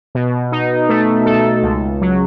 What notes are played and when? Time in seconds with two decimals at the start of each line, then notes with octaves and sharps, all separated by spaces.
0.15 B2
0.52 D#4
0.89 A3
1.26 A4
1.63 C#2
2.01 F#3